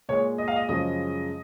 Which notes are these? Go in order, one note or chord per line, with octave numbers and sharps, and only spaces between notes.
A#2 G#3 C#5
D#5
F5
D#5
F#2 C#3 F3 G#3 D#5